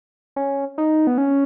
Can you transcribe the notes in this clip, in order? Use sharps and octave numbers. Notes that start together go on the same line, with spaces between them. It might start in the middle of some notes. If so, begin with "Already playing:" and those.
C#4
D#4
B3
C#4